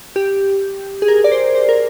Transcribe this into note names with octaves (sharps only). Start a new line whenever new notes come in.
G4
G#4
A#4
D5
C5
C5
A#4